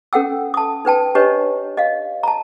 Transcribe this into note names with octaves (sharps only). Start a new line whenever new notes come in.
C#4 A4 F#5 G5 E6
A5 D#6
D#4 B4 G5 A5
D4 G4 B4 C#5 D#5
D#5 F5
A5 A#5